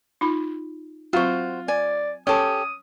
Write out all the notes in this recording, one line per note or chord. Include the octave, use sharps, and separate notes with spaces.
D#4 F4 B5
F#3 C4 F4 F#4 C5 C#6
D5 G#5
C#4 G4 A4 D#6